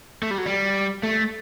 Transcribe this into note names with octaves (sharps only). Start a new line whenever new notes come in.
A3
G3
F#3
G3
A3